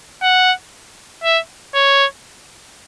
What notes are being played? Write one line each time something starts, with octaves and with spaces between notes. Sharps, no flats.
F#5
E5
C#5